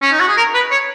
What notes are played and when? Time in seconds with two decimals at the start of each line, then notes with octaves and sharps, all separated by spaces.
0.02 C#4
0.12 D#4
0.20 F#4
0.28 G#4
0.37 A#4
0.54 B4
0.71 C#5